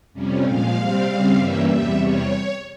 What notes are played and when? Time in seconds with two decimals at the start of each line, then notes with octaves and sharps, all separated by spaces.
0.13 F2 C3 G3 C#4
0.44 A#2 F3 G#3 F5
0.74 C3 G3 C4
1.04 C#3 G3 C4
1.34 G2 E3 G3 A#3 C#4 E5
1.65 E2 C3 G3 E5
1.95 E2 C3 G3 C#5